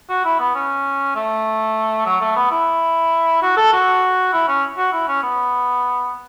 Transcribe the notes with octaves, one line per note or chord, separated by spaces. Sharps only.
F#4
E4
B3
C#4
A3
F#3
A3
B3
E4
F#4
A4
F#4
E4
C#4
F#4
E4
C#4
B3